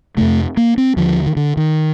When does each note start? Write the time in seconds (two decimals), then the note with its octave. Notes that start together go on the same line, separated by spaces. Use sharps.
0.17 F2 C3 A3
0.57 A#3
0.78 C4
0.96 D#2 D3 F3
1.26 D#3
1.36 D3
1.57 D#3